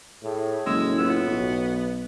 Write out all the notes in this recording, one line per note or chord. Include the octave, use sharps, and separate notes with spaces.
A2 G#4
F#1 A2 G#3 E6
B3 F4
B1 F#4